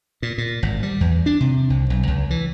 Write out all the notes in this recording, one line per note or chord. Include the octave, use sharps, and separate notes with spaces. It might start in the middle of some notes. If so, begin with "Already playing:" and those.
A#2
A#2
G#1
G3
E2
D4
C3
C2
B1
C#2
E3